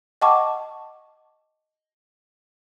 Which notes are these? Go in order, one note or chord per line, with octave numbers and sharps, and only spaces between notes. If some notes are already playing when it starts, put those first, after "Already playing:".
D#5 F#5 G5 A5 C#6 D6